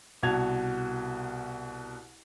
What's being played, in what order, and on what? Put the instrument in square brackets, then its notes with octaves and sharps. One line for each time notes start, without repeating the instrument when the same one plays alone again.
[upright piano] C2 B2 F#4 A5 G#6 F7